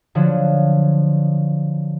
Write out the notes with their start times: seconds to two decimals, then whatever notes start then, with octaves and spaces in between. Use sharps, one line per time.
0.15 D3 F3 F#3